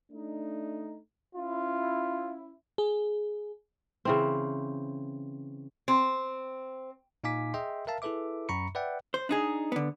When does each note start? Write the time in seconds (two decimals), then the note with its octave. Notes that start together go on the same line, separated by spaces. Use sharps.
0.11 A3 D4 D#4
1.35 C#4 E4 F4
2.78 G#4
4.05 C#3 E3 C4
5.88 C4
7.24 A#2 D#4 F5 G#5 D6 B6
7.54 G#4 D#5 E5 G5 C6
7.87 A#4 E5 F5 A5
8.02 E4 G#4 A4 B4 E5 D6
8.49 F#2 A#5 B5 C#6 C#7
8.75 B4 D5 E5 F#5 G5
9.14 C5
9.29 D4 D#4 G#4
9.72 D3 B3